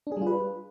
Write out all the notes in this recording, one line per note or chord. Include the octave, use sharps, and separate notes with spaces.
D4
G#4
G3
F4
B4